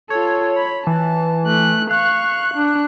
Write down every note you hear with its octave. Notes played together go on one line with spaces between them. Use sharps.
F4 A4 C#5
B5
E3 A5
A3 F#6
F5 C#6 F#6
D4